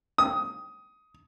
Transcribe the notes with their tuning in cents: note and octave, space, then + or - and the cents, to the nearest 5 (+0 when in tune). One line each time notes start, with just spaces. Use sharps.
D#6 +15